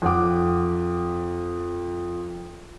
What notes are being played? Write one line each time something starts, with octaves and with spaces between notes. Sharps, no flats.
F2 F#5 D6